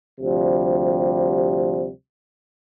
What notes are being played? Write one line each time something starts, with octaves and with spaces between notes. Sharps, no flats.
D2 C3 F3 G3